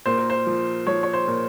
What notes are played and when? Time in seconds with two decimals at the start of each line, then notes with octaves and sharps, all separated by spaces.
0.06 A#2 C5
0.18 A#4
0.30 C5
0.47 F3
0.87 F3 C#5
1.03 C#5
1.13 C5
1.28 A#2